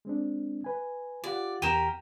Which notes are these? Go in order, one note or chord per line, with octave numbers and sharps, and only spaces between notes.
G#3 C4 D4
B4 G#5
F4 G4 D5 F#5
E2 G4 A#4 D#7 E7